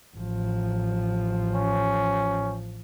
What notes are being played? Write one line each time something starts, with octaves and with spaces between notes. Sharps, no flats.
A1 F3
C#4